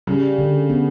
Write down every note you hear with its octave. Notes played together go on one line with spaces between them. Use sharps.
C#3 G3
D3
B3